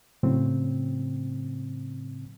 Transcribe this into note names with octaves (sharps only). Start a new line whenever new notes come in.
A2 C#3 F#3 C4